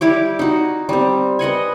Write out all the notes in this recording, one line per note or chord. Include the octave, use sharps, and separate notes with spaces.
G3 E4 G4 D6
D#4 F#4
G3 C4
B4 D#5 F#5 G#5